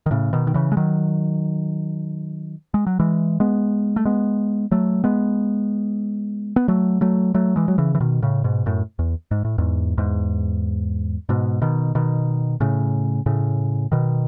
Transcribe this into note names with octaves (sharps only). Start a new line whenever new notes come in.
D#3
A2 C#3
B2 D#3
D#3
C#3 E3
G#3
D#3 F#3
G#3
F#3
E3 G#3
G#3 B3
A3
G#3 B3
F#3 A3
G#3 B3
B3
F#3 A3
F#3 A3
F#3 A3
E3 G#3
F#3
C#3 E3
E3
B2 D#3
A2 C#3
G#2 B2
F#2 A2
E2
G#2
A2
E2 G#2
E2 G#2
G#2 B2
B2 D#3
B2 D#3
A2 C#3
A2 C#3
B2 D#3